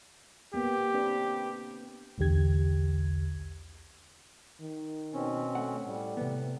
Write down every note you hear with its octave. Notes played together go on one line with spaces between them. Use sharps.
A#3 B3 G4
C4 D4 B4
B1 E2 D3 G4 G#6
D#3
B2 C4 C#4
A3 F#5
A2 G3
C3 B3